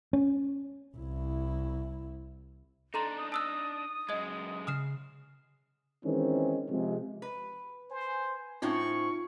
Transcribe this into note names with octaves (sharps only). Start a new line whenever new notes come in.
C#4
C2 E4
D4 D#4 A4 A#5 C6
D#6
A5 D#6 E6 F#6
F#2 G#3 D#5 G#6
C#3 D#6 F6 C7 E7
D#3 E3 G#3 C4 C#4 D#4
C3 F3 G#3
B4
C5 G#5
A2 C4 C#4 D#4 F4 C#6